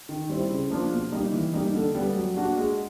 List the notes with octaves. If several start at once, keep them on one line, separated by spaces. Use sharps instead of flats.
D#3
G3 C4 E4
C#3
F3 A#3 D4 F4
B2
G3 A#3 D#4
E3
G3 A#3 D#4
D3
G3 B3
F#3
A#3 D4 F#4
G#3